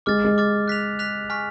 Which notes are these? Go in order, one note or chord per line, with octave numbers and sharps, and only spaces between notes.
G#3 D6 F6 A6
G#3
D6 F6 A6
F#6 B6 F7
F#6 B6 F7
G#5 C#6 F6 B6